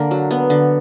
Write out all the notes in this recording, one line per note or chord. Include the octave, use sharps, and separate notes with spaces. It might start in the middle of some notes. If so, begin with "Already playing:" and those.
Already playing: D3 A#3 A#4
F#3
B3
D3